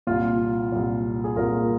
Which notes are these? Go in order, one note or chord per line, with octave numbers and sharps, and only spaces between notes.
C2 A#2 F4
C2 A#2
G#4
C2 A#2 F4 A#4